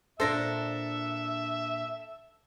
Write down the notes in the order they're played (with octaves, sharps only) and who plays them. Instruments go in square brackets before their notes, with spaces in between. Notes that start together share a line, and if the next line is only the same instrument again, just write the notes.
[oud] A#2 D4 C5 [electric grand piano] A4 A#6 [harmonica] E5